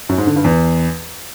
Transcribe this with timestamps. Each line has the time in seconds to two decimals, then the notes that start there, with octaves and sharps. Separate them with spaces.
0.09 F#2
0.18 G#2
0.27 D3
0.36 G2
0.44 E2